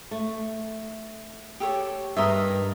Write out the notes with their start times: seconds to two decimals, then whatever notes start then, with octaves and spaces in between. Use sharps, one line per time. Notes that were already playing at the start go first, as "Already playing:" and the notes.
0.11 A3
1.60 G4 A4 C#5
2.17 G2 A#4 D#5 E5